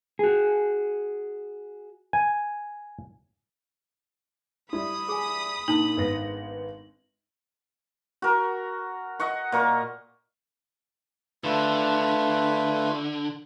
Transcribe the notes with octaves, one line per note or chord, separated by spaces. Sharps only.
F#4 G#4
G#5
G3 E4 B5 D#6
G#4 G#5
A#2 D4 D#4 F#7
G#1 B3 A#6
F#4 A#4
D#5 F#5 C#6
A#2 A#4 C#6
D3 A3 F4 B4